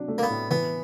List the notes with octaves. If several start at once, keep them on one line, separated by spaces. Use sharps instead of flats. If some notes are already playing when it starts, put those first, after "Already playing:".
Already playing: C3 F#3 D4
A3
A#3
B3
A2
E3 B3